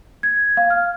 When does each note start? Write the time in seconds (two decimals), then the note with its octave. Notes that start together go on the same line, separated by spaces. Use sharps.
0.23 G#6
0.57 F5
0.70 F6